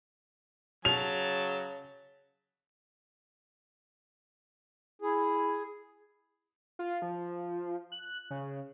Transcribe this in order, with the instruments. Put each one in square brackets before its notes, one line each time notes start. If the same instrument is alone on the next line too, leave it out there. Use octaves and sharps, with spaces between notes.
[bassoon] C#3 [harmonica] F#3 A5 [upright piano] F7
[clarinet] E4 [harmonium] G#4
[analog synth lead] F4
F3
F#6
C#3